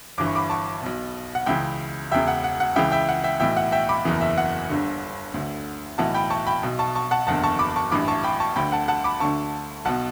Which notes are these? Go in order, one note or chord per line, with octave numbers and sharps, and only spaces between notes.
G1 G2 E3 D6
C#6
B5 D6
A5 C#6
B1 B2
F#5
C#2 C#3 E3 E5 G5
E1 E2 C#3 E5 G5
F#5
F#5
F#5
C#2 C#3 E3 E5 G5
E5 G5
F#5
E5 G5
B1 A2 E3 E5 G5
F#5
E5 G5
B5 D6
F#1 E2 C#3 E3
E5
F#5
G1 G2 D3
D2 D3
B1 A2 E3 F#5 A5
G5 B5
A5 C#6
G5 B5
B1 B2
A5 C#6
A5 C#6
F#5 A5
F#1 E2 D3 F#5 A5
A5 C#6
B5 D6
A5 C#6
A1 G2 E3 B5 D6
A5 C#6
G5 B5
A5 C#6
D2 D3 G5 B5
F#5 A5
F#5 A5
B5 D6
D2 D3 A5 C#6
B1 B2 F#5 A5